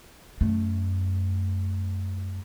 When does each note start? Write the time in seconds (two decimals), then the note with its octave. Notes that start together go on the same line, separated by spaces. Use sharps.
0.41 F#2 A3